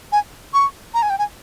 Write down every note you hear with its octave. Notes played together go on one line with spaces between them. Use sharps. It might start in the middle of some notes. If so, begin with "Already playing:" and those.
G#5
C#6
A#5
G#5
G5
G#5